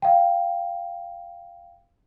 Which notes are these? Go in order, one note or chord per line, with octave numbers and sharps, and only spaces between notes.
F5 G5